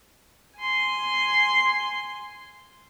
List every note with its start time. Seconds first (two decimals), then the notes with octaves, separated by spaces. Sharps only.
0.59 G#5 C6